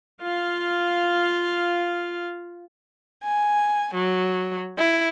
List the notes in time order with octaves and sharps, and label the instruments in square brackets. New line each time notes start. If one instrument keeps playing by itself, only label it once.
[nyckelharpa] F4 F5
[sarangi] G#5
F#3
E4